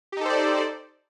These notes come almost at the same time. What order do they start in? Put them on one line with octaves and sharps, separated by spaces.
G4 D#4 A4 C5 D5